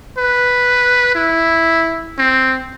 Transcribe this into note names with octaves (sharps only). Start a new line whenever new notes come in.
B4
E4
C4